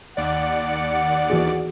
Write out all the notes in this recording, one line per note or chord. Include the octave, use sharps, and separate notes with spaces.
D#2 D5 F#5
E3 F#4 G#4